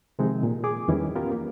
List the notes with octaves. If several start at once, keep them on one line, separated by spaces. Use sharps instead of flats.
C3 D#3 F3 G#3 C4 D#4
A#2
G#4 D6
E2 D#3 E3 G3 C#4 E4
B3 C#4 F4 G4 A#4
A#3